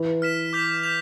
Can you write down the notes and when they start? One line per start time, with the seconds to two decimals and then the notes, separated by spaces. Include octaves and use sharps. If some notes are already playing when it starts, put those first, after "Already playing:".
Already playing: E3
0.22 F6 B6 E7
0.53 D6 G6 B6 F7
0.83 G6 B6 F7